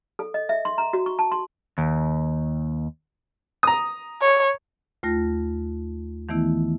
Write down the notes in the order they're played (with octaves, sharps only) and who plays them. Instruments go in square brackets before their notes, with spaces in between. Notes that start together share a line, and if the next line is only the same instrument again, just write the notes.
[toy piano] A4
D#5
E5
C6
A#5
F#4
C#6
A5
C6
[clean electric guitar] D#2
[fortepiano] A#5 D#6
[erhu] C#5
[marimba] D#2 A3 F4 A#6
D#3 E3 A3 B3 E4